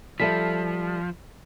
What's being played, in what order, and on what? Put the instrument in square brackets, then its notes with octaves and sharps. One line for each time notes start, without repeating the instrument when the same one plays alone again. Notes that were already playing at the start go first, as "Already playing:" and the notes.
[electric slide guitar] F3 [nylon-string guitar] G3 A4 E5 [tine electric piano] B6